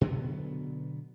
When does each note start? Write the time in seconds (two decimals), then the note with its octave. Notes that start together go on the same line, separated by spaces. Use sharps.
0.01 B2 D3 F#3 B3